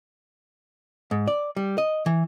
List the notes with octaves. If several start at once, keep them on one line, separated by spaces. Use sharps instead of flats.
G#2
D5
G3
D#5
E3